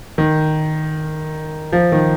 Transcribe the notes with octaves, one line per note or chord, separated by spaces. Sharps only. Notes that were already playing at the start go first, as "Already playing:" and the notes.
D#3
F3
D#3